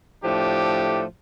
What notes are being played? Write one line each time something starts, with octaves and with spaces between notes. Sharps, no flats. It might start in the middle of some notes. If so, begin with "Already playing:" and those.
A2 F3 A3 D4 G4